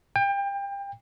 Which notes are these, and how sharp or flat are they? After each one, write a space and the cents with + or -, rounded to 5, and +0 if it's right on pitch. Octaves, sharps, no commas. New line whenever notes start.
G5 +30